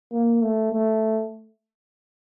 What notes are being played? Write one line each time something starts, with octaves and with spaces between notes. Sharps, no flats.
A#3
A3
A3